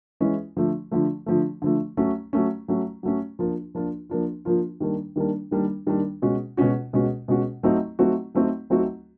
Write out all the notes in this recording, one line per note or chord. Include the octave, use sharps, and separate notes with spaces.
E3 G#3 C#4 E4
D3 F3 A3
D3 F3 A3
D3 F3 A3
D3 F3 A3
F#3 A3 C#4
F#3 A3 C#4
F#3 A3 C#4
F#3 A3 C#4
F3 A#3 D4 F4
F3 A#3 D4 F4
F3 A#3 D4 F4
F3 A#3 D4 F4
D#3 G3 A#3 D4
D#3 G3 A#3 D4
D#3 G3 A#3 D4
D#3 G3 A#3 D4
B2 G#3 C#4 F#4
B2 G#3 C#4 F#4
B2 G#3 C#4 F#4
B2 G#3 C#4 F#4
F#3 A3 C4 D#4 F#4
F#3 A3 C4 D#4 F#4
F#3 A3 C4 D#4 F#4
F#3 A3 C4 D#4 F#4